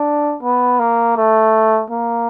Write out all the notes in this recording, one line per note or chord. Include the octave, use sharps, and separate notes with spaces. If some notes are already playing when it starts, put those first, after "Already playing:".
Already playing: D4
B3
A#3
A3
A#3